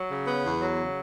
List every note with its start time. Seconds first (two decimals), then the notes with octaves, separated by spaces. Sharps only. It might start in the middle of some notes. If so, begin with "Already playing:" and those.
Already playing: F#3
0.09 C#3
0.27 B3
0.44 E2
0.61 F#3
0.78 C#3